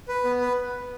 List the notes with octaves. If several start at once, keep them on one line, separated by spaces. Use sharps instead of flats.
B4
B3
B4